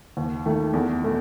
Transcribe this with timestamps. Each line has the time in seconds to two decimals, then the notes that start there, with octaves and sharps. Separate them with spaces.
0.17 D#2
0.46 D#3 A3
0.73 E2
1.02 B2 A3